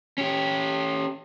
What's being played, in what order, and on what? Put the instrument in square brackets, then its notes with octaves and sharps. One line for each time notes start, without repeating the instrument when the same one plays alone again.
[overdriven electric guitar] C#4 G4